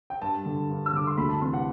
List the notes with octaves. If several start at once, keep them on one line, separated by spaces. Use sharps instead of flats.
G5
G2 A5
D3
G2
E6
D3 D6
C6
D2 B5
A5
C3 E3 C6
F#5